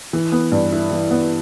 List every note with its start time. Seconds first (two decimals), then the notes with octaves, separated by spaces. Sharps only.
0.13 E3
0.32 B3
0.52 G2
0.72 E4
0.91 E3
1.11 B3